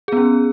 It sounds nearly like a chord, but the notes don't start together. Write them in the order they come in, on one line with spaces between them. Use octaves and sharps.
G#4 B3 C#4